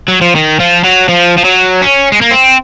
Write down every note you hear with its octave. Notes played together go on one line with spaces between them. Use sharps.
F#3
F3
D#3
F3
F#3
F3
F3
F#3
C#4
G#3
A#3
C4